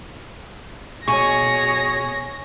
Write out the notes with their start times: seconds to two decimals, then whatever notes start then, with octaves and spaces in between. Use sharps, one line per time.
1.08 B2 G#4 C#5 G#5 C#6 A#6